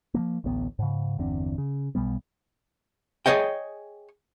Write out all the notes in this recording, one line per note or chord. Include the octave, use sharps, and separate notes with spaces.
F3 F#3 A#3
A1 D2 A2 B3
G#2 C#3
G1 E2 D3 C4
C#3
B1 B2 G3 B3
G#4 B4 C#5 D#5 G5